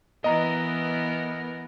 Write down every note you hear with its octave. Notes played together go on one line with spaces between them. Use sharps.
E3 B3 A#4 D#5 A#5